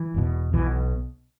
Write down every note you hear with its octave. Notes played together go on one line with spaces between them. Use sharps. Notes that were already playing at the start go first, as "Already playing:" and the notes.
Already playing: E3
E1 E2 B2
B1 B2 E3